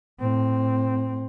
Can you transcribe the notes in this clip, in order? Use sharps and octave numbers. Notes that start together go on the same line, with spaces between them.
A2 C4